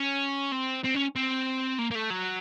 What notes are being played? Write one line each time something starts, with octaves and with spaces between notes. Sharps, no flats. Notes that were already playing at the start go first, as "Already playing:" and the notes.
Already playing: C#4
C4
C4
C#4
C4
A#3
A#3
A3
F#3